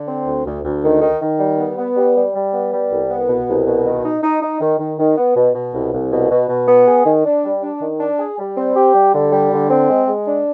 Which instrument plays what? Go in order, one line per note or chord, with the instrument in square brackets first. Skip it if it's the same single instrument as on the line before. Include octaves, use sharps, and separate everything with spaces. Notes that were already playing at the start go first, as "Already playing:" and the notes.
Already playing: [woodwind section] D3
C4
D2
D2
D2
D#3
D#3
D#3
G3
B3
B3
G3
G3
G3
B3
G3
C2
B3
B2
C2
B2
D#3
D#4
D#4
D#4
D#3
D#3
D#3
B3
B2
B2
C2
C2
B2
B2
B2
B3
G#4
D#3
D4
G3
D4
D#3
D4
G#4
G3
C4
G4
G3
D3
G3
D3
C4
G#3
G#3
D4